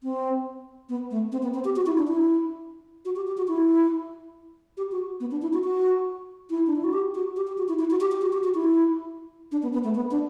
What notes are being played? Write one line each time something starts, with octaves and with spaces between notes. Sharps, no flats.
C4
B3
A3
C4
B3
C4
G4
F#4
E4
D4
E4
F#4
G4
G4
F#4
E4
G4
F#4
B3
D4
E4
F#4
F#4
E4
D4
E4
F#4
G4
F#4
G4
G4
F#4
E4
E4
F#4
G4
G4
F#4
G4
F#4
E4
D4
B3
B3
A3
B3
D4